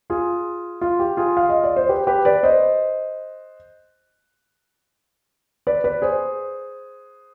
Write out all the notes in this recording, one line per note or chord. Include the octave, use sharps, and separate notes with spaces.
F4 G#4
F4
G4
F4 G#4
F5
D#5
D5
C5
G4 B4
G4 B4
B4 D5
C5 D#5
B4 D5
B4 D5
G#4 C5